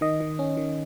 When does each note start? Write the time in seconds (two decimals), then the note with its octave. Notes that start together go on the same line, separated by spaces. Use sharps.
0.01 D#3 D#5
0.20 D#3
0.39 C#4
0.57 D#3